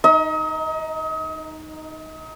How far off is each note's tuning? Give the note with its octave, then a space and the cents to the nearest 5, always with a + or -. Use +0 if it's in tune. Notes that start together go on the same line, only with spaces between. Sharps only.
D#4 +0 D#5 +35